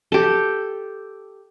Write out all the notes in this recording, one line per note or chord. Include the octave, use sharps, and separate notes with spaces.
G4 A4